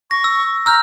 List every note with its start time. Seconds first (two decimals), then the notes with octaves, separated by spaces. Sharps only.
0.11 C#6 A#6
0.24 E6
0.66 A#5 E6 F6 G6